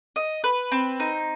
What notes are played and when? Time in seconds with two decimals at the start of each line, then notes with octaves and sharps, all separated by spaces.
0.16 D#5
0.44 B4
0.72 C4
1.00 D#4